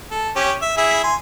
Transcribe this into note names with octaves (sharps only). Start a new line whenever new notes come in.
A4
C#4 G4
E5
E4 G#4 E5
G#5 C6